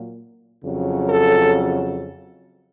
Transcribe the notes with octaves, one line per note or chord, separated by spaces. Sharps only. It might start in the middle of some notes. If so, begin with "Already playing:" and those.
Already playing: A#2 F#3 A#3
F2 C#3 F#3
A4